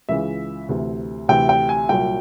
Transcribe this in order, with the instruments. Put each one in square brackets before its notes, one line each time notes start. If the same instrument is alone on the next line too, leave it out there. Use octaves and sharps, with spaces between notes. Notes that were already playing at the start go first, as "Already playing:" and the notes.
[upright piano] C#2 C#3 E3 E5
D2 C3 E3
D2 C3 E3 G5
G5
G#5
C2 A#2 F#3 G5